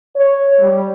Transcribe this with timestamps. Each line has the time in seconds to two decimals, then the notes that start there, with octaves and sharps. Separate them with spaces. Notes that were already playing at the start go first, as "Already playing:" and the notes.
0.16 C#5
0.60 G3